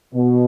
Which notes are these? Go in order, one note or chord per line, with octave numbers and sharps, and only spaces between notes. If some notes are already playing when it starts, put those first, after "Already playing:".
B2